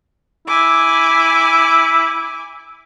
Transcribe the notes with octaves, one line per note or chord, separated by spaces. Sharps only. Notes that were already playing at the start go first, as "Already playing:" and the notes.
E4 G#5 D6